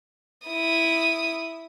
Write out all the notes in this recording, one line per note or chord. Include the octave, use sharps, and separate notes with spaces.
E4 D#6